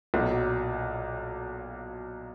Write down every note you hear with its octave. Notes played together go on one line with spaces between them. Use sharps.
B1 A#2 F#3